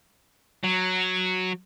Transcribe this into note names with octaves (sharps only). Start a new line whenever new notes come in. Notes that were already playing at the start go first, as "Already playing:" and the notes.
F#3